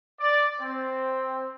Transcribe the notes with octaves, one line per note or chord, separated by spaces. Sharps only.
D5
C4